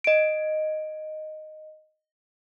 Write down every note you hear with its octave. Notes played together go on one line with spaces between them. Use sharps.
D#5 D7